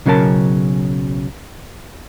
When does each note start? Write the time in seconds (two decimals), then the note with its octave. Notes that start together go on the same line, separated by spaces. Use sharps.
0.06 B1 C#3 F#3 C#4 A#4 A5